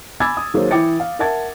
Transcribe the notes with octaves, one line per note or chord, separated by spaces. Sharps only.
G#5 B5 D6 E6 G#6 A6
D#6
D#3 F#3 A#3 G#4 C5 C#5
E3 E4 G5 D6 A6 C#7
F5
A#4 E5 F#5 A5 G#6 A6